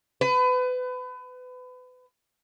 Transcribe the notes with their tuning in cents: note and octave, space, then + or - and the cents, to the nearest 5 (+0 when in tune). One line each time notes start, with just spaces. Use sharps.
B4 +30